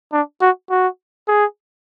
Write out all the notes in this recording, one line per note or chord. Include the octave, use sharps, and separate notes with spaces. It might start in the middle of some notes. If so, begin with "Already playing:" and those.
D4
F#4
F#4
G#4